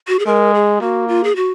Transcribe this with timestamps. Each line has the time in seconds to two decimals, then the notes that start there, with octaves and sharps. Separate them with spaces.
0.08 F#4
0.19 G#4
0.26 G#3 A#4
0.54 G#4
0.81 A#3 F#4
1.08 F4
1.24 G#4
1.36 F#4